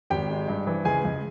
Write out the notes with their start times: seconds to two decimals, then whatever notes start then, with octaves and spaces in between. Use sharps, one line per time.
0.10 G#1 G4 G5
0.30 G#3
0.48 G2
0.67 E3
0.85 C#2 G#4 G#5
1.04 C#2